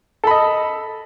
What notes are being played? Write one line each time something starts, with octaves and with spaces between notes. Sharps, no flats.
A4 D#5 B5